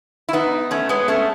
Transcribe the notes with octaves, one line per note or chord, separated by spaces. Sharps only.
E4
B3 D#4
A3 C#4
G#3 B3
A3 C#4